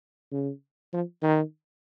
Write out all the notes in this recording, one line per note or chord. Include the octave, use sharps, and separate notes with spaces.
C#3
F3
D#3